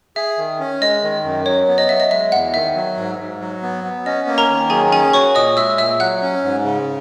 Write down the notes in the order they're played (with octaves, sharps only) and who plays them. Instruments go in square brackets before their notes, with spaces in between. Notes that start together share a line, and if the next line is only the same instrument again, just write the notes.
[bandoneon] G#4 [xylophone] E5
[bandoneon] D#3
C#4
[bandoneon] G#3 [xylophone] D#5
[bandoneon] D#3
F#2
[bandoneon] F#3 [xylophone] C#5
[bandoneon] B3
[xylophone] D#5
[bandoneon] F#3 [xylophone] E5
[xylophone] D#5
[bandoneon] G#3 [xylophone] E5
[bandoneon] E2 [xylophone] F#5
[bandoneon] D#3 [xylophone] E5
[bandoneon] F#3
G#2
G#2
F#3
B3
B3
[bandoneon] C#4 [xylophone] D#5
[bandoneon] A#3
[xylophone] A#4 A#5
[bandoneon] D#3
[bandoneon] F#3 [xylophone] G#4 G#5
[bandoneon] C#4 [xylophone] G#4 G#5
[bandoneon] F#4 [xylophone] C#5 C#6
[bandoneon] A#2 [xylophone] D#5 D#6
[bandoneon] G#3 [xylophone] E5 E6
[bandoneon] A#2 [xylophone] E5 E6
[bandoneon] F#3 [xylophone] F#5 F#6
[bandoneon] C#4
G#2
C#3